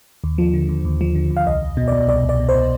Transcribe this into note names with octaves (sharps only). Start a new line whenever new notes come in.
D#2
F3
D3
D#2
D#2
F3
D3
D#2
F5
C2 D#5
C2
B2
B2 D5
C2 D5
C2
D5
B2
C5
B2